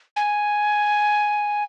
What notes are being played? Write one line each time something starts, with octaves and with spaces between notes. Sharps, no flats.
G#5